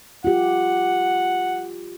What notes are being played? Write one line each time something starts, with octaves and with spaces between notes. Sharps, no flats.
F4 G4 F#5